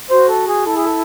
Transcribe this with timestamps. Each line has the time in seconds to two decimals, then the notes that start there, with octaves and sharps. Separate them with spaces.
0.10 F#4 C5
0.28 A4
0.48 G#4
0.65 E4 A4
0.76 G#4
0.84 A4